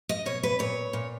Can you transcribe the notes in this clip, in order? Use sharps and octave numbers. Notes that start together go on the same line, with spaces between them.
D#5
B2 C#5
B4
A#2 C#5
A#2